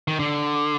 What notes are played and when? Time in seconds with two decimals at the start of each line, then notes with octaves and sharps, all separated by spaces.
0.08 D#3
0.19 D3